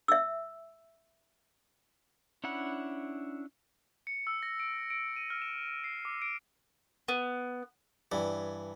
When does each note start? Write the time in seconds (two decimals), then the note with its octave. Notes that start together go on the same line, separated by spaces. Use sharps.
0.08 E5 E6
2.44 C#4 D4 E4 F#5 B5
4.07 C#7
4.27 E6
4.43 A#6
4.60 D7
4.90 D7
5.16 D#7
5.30 F6
5.42 E7
5.84 C7
6.05 D6
6.22 D7
7.08 B3
8.12 G2 E3